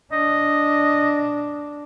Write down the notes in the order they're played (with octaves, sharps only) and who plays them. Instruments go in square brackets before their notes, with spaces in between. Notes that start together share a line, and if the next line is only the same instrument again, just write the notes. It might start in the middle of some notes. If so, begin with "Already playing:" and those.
[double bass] D4 [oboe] D#5